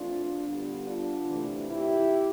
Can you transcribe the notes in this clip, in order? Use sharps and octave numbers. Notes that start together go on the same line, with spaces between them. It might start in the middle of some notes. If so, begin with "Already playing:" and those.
Already playing: E3 A3 C4 D4 F4
D3 G3 B3
D4 F4
C3 E3 A3
E4 G4